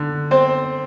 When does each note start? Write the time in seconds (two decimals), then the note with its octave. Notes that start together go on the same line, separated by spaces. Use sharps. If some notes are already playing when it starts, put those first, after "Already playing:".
Already playing: D3
0.31 C4 C5